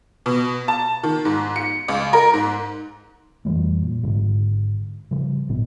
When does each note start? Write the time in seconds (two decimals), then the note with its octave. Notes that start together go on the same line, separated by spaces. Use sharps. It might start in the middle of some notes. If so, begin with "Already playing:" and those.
0.26 B2
0.68 A5
1.03 D#3
1.25 G#2
1.56 C#7
1.88 C#2
2.13 A#4
2.33 G#2
3.45 F2 E3 G3 A3
3.82 A#2
4.03 G#1 G#2 D3 G#3
5.11 C#3 F3 G3
5.49 G#1 A#2 B3